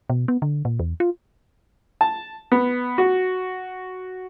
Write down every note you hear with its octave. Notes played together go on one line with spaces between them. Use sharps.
B2
B3
D3
A#2
E2
F4
A5
B3
F#4